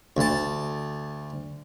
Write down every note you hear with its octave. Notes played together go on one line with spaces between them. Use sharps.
D2 A5